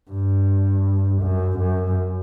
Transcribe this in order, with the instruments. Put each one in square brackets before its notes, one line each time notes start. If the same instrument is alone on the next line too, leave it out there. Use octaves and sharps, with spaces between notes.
[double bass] G2
F#2
F#2